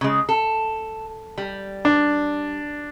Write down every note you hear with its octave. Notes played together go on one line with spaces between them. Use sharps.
C#3 G#3
A4
G3
D4